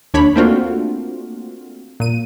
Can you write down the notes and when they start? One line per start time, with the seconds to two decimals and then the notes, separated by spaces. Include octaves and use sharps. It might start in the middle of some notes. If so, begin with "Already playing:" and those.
0.14 D#2 D4 C#5 B5
0.36 A3 A#3 C4 D4 F4 F#4
2.00 A#2 D#7